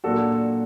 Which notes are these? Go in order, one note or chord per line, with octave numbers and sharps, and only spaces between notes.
A#2 F#3 A#3 D4 F#4 A4